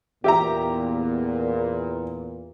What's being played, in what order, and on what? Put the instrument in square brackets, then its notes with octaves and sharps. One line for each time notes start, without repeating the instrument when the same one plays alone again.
[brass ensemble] E2 A#2 [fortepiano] G4 E5 A#5